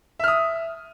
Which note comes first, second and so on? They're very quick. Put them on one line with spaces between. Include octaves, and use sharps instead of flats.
E5 F6 D#6